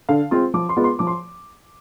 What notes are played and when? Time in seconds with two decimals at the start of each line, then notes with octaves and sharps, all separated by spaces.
0.09 D3 F5
0.31 G#3 C4 F4
0.54 F3 D6
0.69 C6
0.77 G#3 B3 F4
0.84 C6
0.99 F3 D6
1.07 C6